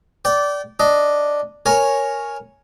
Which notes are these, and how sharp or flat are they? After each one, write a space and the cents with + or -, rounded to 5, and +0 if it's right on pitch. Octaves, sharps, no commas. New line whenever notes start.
D5 -15 G5 -30
D4 +0 D#5 +0
A#4 +0 C#5 +0 G#5 +0